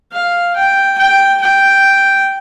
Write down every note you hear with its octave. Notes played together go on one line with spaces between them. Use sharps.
F5
G5
G5
G5